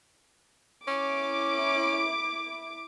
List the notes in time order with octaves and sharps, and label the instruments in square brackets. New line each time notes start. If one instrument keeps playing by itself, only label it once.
[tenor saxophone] C#4 [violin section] E4 D6